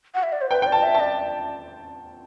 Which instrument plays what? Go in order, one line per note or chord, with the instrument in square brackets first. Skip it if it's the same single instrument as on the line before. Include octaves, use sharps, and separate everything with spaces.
[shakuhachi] F#5
E5
D5
C5
[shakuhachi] B4 [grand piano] G5
[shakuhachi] D5 [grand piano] G5
[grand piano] A5
[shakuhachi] E5
[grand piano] A5
[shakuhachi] D5